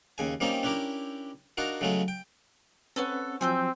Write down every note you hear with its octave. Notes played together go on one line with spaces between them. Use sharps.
D#2 C#3 G#5
G3 A#3 C4 C#4 D#4 F4
C#4 D4 E4 G4 A#4
D4 D#4 F4 F#4 A#4
C#3 F#3 G#3 A3 C#4 F4
G5
C4 C#4 A4 B4 C#5 F#5
F3 F#3 C4 G#5 E6 G6